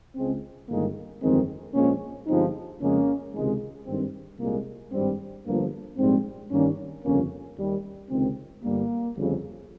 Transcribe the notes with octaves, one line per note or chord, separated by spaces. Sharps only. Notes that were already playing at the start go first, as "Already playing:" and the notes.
C#2 C#3 G#3 C4
G1 G2 D#3 G#3 A#3
G1 F2 D#3 G#3 C4
A#1 A#2 F3 G#3 A#3 C#4
G1 G2 F3 G#3 C4 D#4
F2 C#3 G#3 A#3 C#4
C#2 C3 D#3 G#3
G#1 G2 D#3 C4
C2 A#2 G#3 A#3
G#1 G2 G3 C4
G1 G2 F3 A#3
A#1 G#2 G3 C4
G2 D#3 G3 A#3 C#4
G1 F2 C#3 A#3 C#4
D#2 D#3 G3
C#2 C3 D#3 C4
G1 G2 G3 A#3
G1 F2 C#3